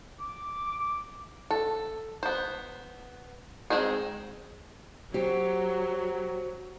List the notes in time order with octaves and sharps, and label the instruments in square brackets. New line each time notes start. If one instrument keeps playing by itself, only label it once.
[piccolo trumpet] D6
[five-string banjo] A4
B3 C5
G#3 A#3 C4 D#4 G#4
[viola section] F#3 [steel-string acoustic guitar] G4 [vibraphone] C5